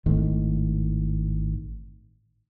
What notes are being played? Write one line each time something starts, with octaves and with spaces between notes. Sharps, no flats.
G#1 A2 D#3